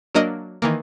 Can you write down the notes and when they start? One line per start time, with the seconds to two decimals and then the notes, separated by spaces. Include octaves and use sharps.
0.14 F#3 A#3 D4 A#4 D#5
0.62 D#3 E3 A#3